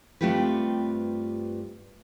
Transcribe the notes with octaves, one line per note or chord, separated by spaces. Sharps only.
G2 A3 C4 F4 G4 B4